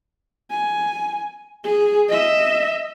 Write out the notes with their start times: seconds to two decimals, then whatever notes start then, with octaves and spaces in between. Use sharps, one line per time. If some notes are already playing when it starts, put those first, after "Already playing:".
0.51 G#5
1.64 G#4
2.09 D#5 E5